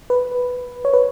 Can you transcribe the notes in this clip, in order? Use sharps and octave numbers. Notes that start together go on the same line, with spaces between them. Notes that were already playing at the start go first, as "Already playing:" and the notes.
B4
C#5
B4